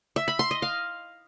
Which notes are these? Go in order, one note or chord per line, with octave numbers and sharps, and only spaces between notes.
E5
B5
C6
D#5
F5